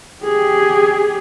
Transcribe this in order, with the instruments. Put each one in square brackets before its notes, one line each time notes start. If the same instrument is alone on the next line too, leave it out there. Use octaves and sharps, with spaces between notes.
[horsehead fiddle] G4 G#4